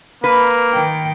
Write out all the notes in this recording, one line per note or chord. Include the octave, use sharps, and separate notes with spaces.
A#3 B4
D#3 G5